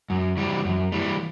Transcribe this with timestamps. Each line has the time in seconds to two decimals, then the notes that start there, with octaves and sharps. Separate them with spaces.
0.10 F#2
0.37 E3 G3
0.65 F#2
0.92 E3 G3